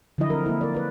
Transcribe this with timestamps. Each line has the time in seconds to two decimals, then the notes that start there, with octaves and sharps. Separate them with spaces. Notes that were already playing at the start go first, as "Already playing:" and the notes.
0.18 D3 F3 F#3 E4 D#5
0.30 C4 A#4
0.46 A#3 E4
0.61 A#4 D5
0.74 B4 D5